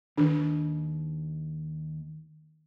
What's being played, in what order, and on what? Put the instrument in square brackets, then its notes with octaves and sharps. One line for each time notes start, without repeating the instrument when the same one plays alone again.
[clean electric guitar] D#2 [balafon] D#3 D4